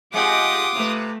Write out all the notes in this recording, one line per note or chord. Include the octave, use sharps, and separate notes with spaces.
G#3 C4 F4 G4 F#5 D6 D#6
C3 A3 B4